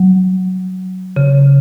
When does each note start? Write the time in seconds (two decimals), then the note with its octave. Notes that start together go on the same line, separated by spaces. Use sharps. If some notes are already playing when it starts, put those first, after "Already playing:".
Already playing: F#3
1.16 C#3